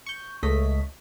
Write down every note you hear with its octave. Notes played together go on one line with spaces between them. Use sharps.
C#6 G6
C#2 A3 C#5 D#5 B6